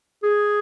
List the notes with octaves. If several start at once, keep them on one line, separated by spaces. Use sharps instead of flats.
G#4